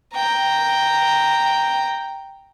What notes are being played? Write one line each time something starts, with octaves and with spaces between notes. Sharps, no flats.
G5 A#5